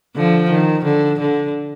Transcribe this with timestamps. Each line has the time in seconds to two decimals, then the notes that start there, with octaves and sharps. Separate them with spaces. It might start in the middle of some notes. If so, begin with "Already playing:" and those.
0.16 D3 F3
0.50 D#3
0.85 D3
1.20 D3